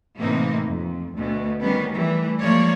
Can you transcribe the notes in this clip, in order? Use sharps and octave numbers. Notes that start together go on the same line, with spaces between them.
A2 C3 E3 A#3 C4 D#4
F2
D2 B2
D#3 G3 B3 C#4
E3 G3 A3
F3 G#3 A#3 C#5 D5